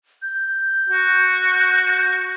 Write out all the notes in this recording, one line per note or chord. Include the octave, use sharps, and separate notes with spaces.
G6
F#4